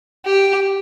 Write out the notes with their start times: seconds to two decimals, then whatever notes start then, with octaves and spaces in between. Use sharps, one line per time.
0.25 G4